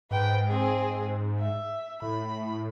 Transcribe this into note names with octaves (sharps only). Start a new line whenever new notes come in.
G#2 B4 G5
C4 G#4
E5
A2 B5